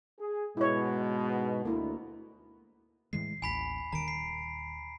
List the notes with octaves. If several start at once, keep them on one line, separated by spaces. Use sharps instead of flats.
G#4
G#2 B2 G#3 E4 C#5
D2 A#3 E4
A2 E3 G#3 C7
A1 D#2 G#5 B5 B6
D#1 D#3 A#5 D7
C7